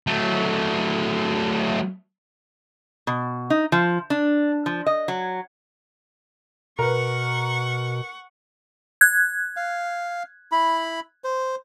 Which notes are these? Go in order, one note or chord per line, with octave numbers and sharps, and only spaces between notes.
F#3 A3
B2
D#4
F3
D4
F3
D#5
F#3
B2 A#4 B4 F#5 C#6
F#6 G#6
F5
E4 B5
C5